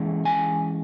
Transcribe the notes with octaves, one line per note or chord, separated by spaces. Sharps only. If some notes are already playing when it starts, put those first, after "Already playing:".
Already playing: E3 G#3 C#4 E4
G#5